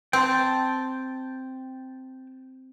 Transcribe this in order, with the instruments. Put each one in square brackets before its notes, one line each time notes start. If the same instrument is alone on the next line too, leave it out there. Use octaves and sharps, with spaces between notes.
[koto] C4 [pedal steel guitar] G5 A5